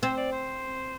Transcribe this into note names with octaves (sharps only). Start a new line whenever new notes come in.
C4 C5
D5
C5